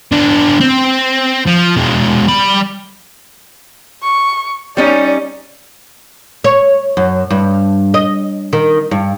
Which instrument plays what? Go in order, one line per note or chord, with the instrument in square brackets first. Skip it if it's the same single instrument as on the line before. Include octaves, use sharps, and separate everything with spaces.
[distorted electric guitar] B3 D4
C4
F3
B2 G#3
G3 B5
[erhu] C#6
[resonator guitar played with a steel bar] G3 C#4 D#4 [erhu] D5
[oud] C#5
F#2
G2
D#5
D#3
G2